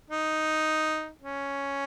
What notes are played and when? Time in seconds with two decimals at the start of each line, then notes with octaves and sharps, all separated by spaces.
0.11 D#4
1.22 C#4